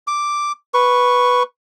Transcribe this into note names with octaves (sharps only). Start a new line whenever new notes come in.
D6
B4 C#6